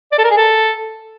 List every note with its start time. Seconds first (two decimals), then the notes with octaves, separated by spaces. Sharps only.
0.12 D5
0.18 A4
0.24 A#4
0.31 G#4
0.37 A4